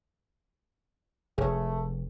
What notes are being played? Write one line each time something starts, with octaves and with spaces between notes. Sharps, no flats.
F1 A3 G#4 C#5